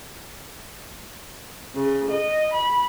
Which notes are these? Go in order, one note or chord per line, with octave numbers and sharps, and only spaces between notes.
C#3
D#5
B5